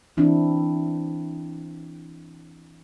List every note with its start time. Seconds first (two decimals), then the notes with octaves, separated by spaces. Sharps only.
0.17 E3 C4 D4 E4